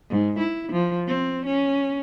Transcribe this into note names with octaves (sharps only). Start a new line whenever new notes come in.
G#2
E4
F3
C4
C#4